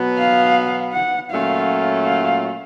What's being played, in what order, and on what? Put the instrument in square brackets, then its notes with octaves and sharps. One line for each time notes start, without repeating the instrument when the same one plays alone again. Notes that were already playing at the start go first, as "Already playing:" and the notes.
Already playing: [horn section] B2 F#3 B3
[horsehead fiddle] F5
F#5
[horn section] A#2 F#3 A3 C#4 F4 [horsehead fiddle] F5
[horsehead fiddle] F5